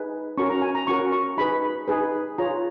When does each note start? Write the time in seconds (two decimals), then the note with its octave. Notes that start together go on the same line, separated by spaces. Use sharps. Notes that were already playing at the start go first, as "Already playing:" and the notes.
Already playing: D#4 G#4 B4
0.37 C#4 F#4 A#4 C#6
0.50 A#5
0.62 G#5
0.75 A#5
0.87 C#4 F#4 A#4 C#6
1.12 C#6
1.37 D#4 G#4 B4 B5
1.88 D#4 G#4 B4
2.38 F4 G#4 C#5 A#5